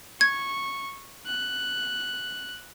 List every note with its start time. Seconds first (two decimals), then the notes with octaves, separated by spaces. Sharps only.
0.21 C#6 G#6
1.27 F#6